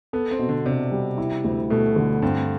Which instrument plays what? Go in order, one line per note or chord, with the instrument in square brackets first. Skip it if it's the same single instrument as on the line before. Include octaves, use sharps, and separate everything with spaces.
[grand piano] B3 [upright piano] A4
[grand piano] C4
[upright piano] B2
[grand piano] D3
[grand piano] C3 [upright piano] D4
[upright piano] G3
E4
D2
[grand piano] B2 [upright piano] A3
[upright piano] D3
[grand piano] G2 [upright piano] C4